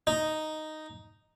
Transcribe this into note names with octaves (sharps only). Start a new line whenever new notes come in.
D#4